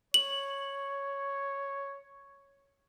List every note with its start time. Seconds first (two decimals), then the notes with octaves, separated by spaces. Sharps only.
0.14 C#5 F#7